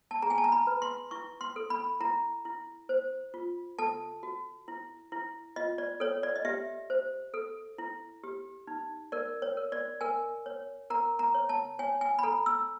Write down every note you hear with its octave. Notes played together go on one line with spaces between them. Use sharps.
A5
G#4 A#5
G#5
A5
A#5
B5
B4
C6
E4 C#6
C6
A4
B5
E4 A#5
E4
C5
F4
A4 A5
F#4
E4
E4
F4 D#5
D5
A4 C#5
D5
D#5
G4 E5
C5
A4
E4
G4
D#4
A#4 D5
C#5
A#4
D5
A#4 G#5
C#5
A#4 A#5
A#5
C#5
A5
C#5 G#5
G#5
B5
A4 A#5
E6